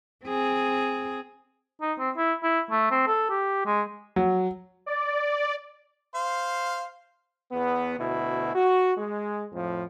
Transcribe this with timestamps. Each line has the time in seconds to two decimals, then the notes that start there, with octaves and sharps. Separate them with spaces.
0.25 C4 G#4
1.81 D#4
1.99 C4
2.17 E4
2.43 E4
2.71 A3
2.91 C4
3.07 A4
3.30 G4
3.66 G#3
4.16 F#3
4.86 D5
6.15 C5 F5
7.51 E2 B3
7.98 D2 B2 E4
8.54 F#4
8.97 G#3
9.52 F2 A2 F3